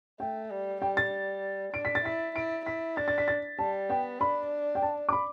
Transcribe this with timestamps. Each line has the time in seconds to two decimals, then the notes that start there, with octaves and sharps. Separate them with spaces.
0.20 A3 G5
0.51 G3
0.82 G3 G5
0.97 A6
1.73 D4 D7
1.85 B6
1.95 A6
2.05 E4 B6
2.36 E4 D7
2.66 E4 B6
2.97 D4 A6
3.08 A6
3.18 B6
3.28 A6
3.59 G3 A5
3.90 B3 G5
4.21 D4 B5
4.75 G5
4.82 A5
5.09 D6
5.12 B5